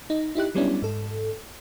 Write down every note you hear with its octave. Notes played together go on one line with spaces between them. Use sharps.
D#4
D#4 E4 G4 F#6
F#3 G3 B3 C#4 D4 E4
G#2 A4